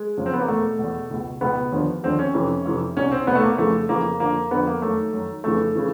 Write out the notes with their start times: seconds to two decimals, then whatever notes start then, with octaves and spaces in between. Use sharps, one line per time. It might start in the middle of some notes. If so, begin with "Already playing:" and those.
Already playing: G#3
0.17 F#2 C#3 F3
0.26 C4
0.33 B3
0.41 A#3
0.48 E2 B2 A3
0.79 E2 B2
1.11 C#2 B2
1.41 C#2 B2 B3
1.72 D#2 D3 F3
2.03 D#2 D3 F3 C4
2.19 C#4
2.34 F2 C3 E3
2.66 F2 C3 E3
2.97 C2 B2 C#4
3.12 C4
3.27 C2 B2 B3
3.35 A3
3.43 A#3
3.58 F2 C#3 E3 A3
3.89 F2 C#3 E3 A#3
4.20 F2 D3 F3 A#3
4.51 F2 D3 F3 B3
4.67 A#3
4.82 F#2 D#3 A3
5.13 F#2 D#3
5.44 F2 C#3 E3 A3
5.75 C#3 E3